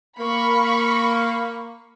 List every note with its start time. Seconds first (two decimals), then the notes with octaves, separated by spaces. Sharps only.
0.17 A#3 B5 C#6